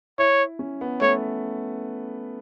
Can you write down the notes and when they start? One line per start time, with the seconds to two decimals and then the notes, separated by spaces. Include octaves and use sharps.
0.18 E4 C#5
0.59 C#4
0.81 B3
1.01 A3 C#5